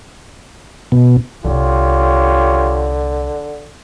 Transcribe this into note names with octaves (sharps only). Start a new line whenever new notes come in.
B2
C2 A#2 D3 F4 G4 C#5